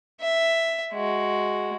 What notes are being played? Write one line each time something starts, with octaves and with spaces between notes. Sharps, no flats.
E5
G#3 F#4